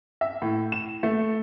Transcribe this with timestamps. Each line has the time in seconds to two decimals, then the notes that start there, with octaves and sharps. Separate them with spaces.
0.21 E5
0.42 A2
0.72 E7
1.03 A3